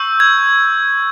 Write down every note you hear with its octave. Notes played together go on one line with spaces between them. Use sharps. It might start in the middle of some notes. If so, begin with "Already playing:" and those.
Already playing: C#6 E6 G6
G#6